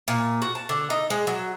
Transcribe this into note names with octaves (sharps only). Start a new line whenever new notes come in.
A#2
F#4
A5
D3
D#4
G#3
F#3